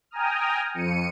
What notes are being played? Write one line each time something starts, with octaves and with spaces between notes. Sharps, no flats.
G5 G#5 A#5 D#6 F6
F2 C#7 D#7